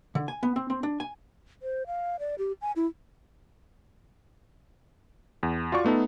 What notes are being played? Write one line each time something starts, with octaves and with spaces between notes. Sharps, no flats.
D3
G#5
B3
C4
C4
D4
G#5
C5
F5
D5
G4
G#5
E4
E2
F4 F#4 D5 C#6
A3 B3 D#4 A4